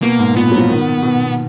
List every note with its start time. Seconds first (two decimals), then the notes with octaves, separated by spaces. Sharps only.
0.02 B2 A#3
0.19 G#2
0.36 A#2 B3
0.52 F#3
0.58 F3
0.69 D#3
1.03 B2